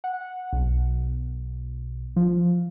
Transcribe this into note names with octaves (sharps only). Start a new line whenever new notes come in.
F#5
B1
F3